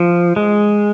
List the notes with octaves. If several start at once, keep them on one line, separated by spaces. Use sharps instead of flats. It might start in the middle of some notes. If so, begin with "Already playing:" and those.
Already playing: F3
G#3